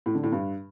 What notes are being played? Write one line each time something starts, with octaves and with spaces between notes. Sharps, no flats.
A2
D3
A2
G2